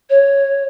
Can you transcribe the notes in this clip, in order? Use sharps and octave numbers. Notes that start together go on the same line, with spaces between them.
C#5